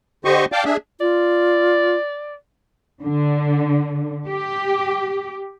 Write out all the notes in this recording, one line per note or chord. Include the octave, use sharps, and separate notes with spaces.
D3 G4 C5 D#5 C#6
D5 F5 G5 A5 D6
D4 G#4 E5
F4 D5
D3
G4